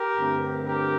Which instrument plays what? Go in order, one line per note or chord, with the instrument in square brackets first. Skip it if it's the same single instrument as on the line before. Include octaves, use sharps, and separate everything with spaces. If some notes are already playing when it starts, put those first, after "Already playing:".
Already playing: [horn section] G4 A#4
G2 D3 A3 C4
G4 A#4